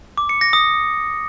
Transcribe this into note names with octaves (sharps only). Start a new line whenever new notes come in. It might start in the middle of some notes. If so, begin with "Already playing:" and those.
D6
C#7
A#6
D#6